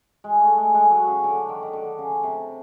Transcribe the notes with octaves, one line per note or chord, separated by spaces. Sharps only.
G#3
A3
G#3
G#3
F#3
C#3
D3
D#3
D#3
D3
C#3
C3